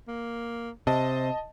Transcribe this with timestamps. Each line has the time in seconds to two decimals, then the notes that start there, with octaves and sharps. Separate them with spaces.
0.08 A#3
0.87 C3 C5 D#5 A5